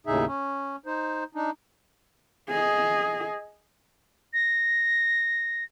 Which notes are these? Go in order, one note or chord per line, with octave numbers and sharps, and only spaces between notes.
D#2 A2 C#3 D#4 G#4 E5
C#4
D#4 C5
D4 D#4
G#4 D#5
A#6